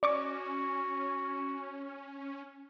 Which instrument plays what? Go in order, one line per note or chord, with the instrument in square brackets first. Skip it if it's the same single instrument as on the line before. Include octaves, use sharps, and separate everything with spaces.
[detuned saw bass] C#4 [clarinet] F#4 [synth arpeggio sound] D5 C#6 D6